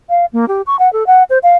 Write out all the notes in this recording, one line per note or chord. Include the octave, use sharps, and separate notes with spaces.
F5
A#3
G4
C#6
F#5
A4
F#5
C5
F5